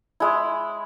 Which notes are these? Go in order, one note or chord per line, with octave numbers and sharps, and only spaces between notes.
G#3 E4